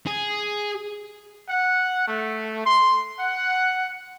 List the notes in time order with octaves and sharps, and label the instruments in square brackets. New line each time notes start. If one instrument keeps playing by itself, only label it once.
[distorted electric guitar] G#4
[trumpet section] F#5
A3
C6
F#5